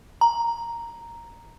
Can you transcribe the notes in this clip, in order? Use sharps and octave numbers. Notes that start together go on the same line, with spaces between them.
A#5